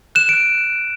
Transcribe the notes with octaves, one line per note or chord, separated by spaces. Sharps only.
F#6 E7
F#6 D7